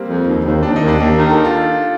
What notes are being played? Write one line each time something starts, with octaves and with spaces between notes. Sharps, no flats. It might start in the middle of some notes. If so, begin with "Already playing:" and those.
Already playing: G3 A#3 C4
F2
D#2
D#2
D#2 D4
D#4
D#2
D4
D#2
D#3
A4
G4
F4